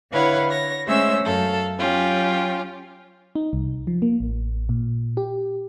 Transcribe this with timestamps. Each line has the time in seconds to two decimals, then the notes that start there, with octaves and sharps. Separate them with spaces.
0.11 D3 E4 B4 C#5 F5 F#5
0.49 C#5 A#6
0.86 G#3 A3 C#4 C5 E5 E6
1.23 F#2 A4 F5
1.77 F#3 C#4 F4 G4
3.35 D#4
3.53 C2
3.87 F3
4.02 A#3
4.20 A1
4.69 A#2
5.17 G4